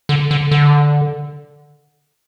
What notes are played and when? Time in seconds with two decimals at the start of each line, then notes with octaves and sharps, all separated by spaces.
0.09 D3
0.31 D3
0.51 D3